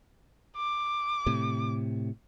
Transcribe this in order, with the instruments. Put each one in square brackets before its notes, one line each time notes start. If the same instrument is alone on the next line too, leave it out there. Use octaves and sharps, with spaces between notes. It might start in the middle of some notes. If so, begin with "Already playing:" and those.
[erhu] D6
[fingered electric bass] A2 C3